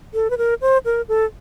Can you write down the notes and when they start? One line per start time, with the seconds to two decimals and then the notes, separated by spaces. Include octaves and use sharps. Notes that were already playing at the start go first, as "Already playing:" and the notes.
0.14 A4
0.30 B4
0.38 A#4
0.62 C5
0.85 A#4
1.08 A4